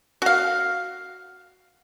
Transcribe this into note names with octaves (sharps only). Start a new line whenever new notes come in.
F#4 F5